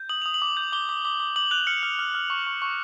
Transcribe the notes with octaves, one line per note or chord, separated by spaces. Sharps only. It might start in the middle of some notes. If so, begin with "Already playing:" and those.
Already playing: G6
D#6 F#7
D#6 F7
F#7
D6
G6
D6 G7
D6
D6
D6
D6 F#7
F#6 F7
F6 C#7
F6
F6
F6
C#6
C#6
C#6